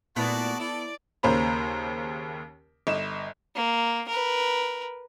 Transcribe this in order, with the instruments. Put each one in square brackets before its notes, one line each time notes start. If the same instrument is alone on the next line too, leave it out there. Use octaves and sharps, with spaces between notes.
[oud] A#2 A3 E4 [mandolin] B3 [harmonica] F#4 [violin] D5 A5
[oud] E4 [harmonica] A4 [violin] D5
[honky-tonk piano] D#2 C#3 A#3 C5 A#5 B5
G1 D#5 E7
[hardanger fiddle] A#3
A#4 B4